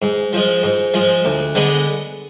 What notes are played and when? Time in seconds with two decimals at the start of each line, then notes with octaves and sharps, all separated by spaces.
0.02 G#2
0.33 F3 G#3
0.63 G#2
0.94 F3 G#3
1.25 D2
1.55 D3 G#3 B3